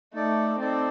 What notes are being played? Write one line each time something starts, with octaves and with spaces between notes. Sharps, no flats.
A3 D#4 A4 D5
C4 D#4 A4 D5